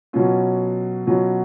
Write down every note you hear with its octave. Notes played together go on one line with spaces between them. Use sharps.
B2 F#3 C#4 F4
B2 F#3 C#4 F4